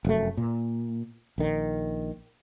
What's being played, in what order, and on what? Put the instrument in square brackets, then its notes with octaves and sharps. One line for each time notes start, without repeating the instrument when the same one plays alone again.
[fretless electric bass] F1 F#2 A3
A#2
A#1 D#3